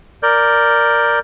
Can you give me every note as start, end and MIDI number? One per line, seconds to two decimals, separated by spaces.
0.23 1.19 70
0.23 1.19 74
0.23 1.19 91